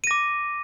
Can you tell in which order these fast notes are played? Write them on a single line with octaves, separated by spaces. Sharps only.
D#7 A#6 D6